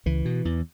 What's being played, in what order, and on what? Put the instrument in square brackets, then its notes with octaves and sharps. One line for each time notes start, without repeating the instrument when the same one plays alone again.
[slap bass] C#2 E3
B2
E2